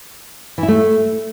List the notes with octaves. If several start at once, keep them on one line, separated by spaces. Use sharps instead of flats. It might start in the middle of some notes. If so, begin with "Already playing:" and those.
E3
E4
A3